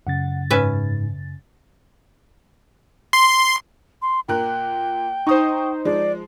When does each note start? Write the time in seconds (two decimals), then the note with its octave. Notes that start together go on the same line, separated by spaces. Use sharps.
0.07 F#2 C#3 F#5 A6
0.50 G#2 C#4 B4 E5
3.13 C6
4.02 C6
4.28 A#2 A#4 G5 F#6
5.27 D#4 C5 C#6 D#6
5.85 F3 G#3 D5